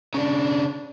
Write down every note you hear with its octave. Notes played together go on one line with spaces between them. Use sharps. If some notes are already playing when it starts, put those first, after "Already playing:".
C#3 D4